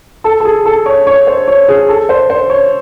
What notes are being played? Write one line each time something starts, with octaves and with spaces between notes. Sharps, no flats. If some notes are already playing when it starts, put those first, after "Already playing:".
A4
A4
G#4
A4
C#5
C#5
C5
C#5
G#4
A4
C5
C5
C#5